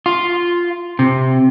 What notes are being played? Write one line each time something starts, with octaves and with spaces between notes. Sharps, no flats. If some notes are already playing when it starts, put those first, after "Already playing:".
F4
C3